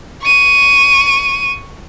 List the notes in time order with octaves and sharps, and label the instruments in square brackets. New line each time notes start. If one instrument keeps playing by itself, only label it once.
[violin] C#6 D#7